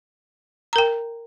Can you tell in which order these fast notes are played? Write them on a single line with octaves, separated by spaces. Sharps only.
A#5 A#4 G5